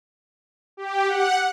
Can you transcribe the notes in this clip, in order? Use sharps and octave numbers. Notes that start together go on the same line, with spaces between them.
G4
F#5